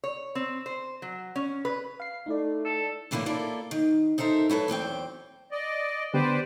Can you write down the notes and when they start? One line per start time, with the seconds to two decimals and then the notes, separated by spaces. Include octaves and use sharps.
0.04 C#5
0.35 C4
0.66 C5
1.02 F#3
1.36 C#4
1.65 B4
2.00 F5 C7
2.26 A3 D#4 E4 D5
2.65 A4
3.11 A2 D3 E3 A#3 E4 F4
3.26 A#3 E4 F4 A4 D5
3.71 D#3
4.18 D#4 A4 A#4 C5 E5
4.50 F#3 E4 A4 B4
4.68 E2 F#3 C4 G5
5.51 D5 D#5
6.14 D3 B3 G4 B4 C5 D5